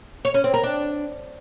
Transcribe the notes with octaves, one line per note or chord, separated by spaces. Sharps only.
C#5
C#4
C4
A#4
D4